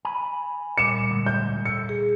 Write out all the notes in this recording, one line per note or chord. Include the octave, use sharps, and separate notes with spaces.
G#5 B5
A#2 G3 D6 C#7 E7
D2 G#2
G6
A4 C#7
G#4